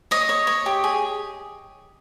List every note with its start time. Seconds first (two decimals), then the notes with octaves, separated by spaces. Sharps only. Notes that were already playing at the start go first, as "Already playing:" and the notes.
0.11 C#5 D#5
0.29 C#5
0.47 C#5
0.66 G4
0.84 G#4